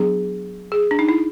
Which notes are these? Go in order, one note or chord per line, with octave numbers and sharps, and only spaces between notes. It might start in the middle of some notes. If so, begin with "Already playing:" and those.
Already playing: F#3 B3 D4 G#4
G#4
D4
D#4
E4